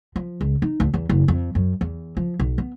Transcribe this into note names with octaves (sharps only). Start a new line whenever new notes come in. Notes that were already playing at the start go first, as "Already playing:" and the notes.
F3
C#2
D#4
D2
E2
F#1
F2
F#2
E2
F3
B1
B3